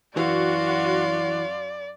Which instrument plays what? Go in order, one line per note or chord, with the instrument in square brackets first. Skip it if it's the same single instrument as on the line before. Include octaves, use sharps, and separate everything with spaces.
[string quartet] F#2 F5 C6 [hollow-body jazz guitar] E3 [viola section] F#4 [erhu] D5